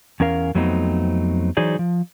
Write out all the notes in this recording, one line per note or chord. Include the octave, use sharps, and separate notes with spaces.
E2 C#4 A#4 F5
F2 F#3 A3 B3 C4 D#4
E3 F#3 D#4 G#4 C5 D5
F3